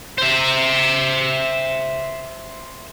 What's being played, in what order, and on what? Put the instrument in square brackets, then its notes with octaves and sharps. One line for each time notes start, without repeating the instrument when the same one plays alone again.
[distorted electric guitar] C5 E5